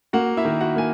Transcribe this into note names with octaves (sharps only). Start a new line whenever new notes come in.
A#3 F#4 F#5
E4 E5
D#3
F#4 F#5
A#3 G#5